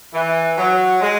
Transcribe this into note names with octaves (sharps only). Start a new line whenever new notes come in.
E3
F#3
G#3